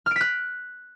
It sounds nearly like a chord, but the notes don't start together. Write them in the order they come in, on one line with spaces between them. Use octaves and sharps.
F6 D7 B6 F#6